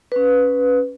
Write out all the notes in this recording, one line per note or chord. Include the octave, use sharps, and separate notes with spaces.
C#4 B4